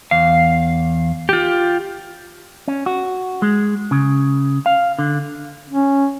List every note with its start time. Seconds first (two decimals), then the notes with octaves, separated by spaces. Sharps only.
0.11 E2 F5
1.29 F4 G4
2.68 C#4
2.86 F#4
3.42 G#3
3.91 C#3
4.66 F5
4.99 D3
5.70 C#4